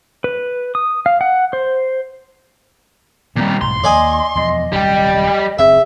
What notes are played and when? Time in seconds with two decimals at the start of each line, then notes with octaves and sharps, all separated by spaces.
0.24 B4
0.75 D#6
1.06 F5
1.21 F#5
1.53 C5
3.36 A#2 D#3 G3 C4 A#5
3.61 B1 G#2 B2 C6
3.84 D#2 D#3 A#3 D5 D#5 G#5 D#6
4.35 E2 B2 F3 D#5
4.73 D#1 C2 F#3 G3 G5
5.59 F#1 C4 G#4 E5